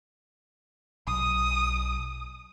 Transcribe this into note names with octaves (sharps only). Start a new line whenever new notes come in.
B1 D#6